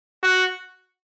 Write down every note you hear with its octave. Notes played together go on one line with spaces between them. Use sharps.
F#4